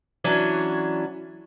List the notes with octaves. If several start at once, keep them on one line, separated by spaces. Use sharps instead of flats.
E3 F#3 C#4 D4